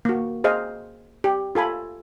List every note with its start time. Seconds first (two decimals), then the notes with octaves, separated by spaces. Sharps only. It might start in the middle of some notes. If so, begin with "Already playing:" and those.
0.05 A#3 F#4
0.44 G#4 C5 D#5 F5
1.24 G4
1.55 F4 A4 G#5 B5